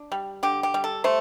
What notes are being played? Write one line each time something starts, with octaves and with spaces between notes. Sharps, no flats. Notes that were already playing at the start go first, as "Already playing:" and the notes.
Already playing: D4
G3
D3 G4
G4
G3
A4
A3 C5